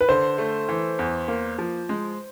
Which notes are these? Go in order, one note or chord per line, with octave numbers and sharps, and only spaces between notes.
B4
D3 C5
A3
E3
E2
A#3
F3
G#3